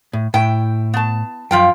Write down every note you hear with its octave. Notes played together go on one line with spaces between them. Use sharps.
A2
A2 E4 G5
B3 A5
F#2 F3 F4 G5